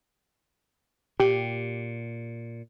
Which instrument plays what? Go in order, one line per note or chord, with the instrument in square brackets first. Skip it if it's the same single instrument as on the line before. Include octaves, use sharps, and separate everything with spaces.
[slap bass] A#2 [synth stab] G4